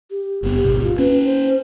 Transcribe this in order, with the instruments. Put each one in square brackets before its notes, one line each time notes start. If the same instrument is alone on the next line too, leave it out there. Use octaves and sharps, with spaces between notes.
[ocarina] G4
[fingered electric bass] F#1 B3 [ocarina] G4
[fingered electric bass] D1 G#1 B2
[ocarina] F4
[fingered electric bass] A#3 C#4 [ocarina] B4
[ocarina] C5